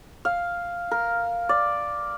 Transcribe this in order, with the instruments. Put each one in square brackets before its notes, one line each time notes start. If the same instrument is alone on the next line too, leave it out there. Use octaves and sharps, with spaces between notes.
[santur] F5
A#4
D5